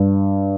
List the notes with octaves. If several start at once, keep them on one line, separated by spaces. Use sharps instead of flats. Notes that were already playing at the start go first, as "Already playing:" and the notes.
Already playing: G2